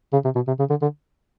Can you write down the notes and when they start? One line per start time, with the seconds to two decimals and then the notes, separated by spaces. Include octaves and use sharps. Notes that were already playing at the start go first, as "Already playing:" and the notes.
0.12 C#3
0.24 C3
0.35 B2
0.47 C3
0.59 C#3
0.70 D3
0.82 D3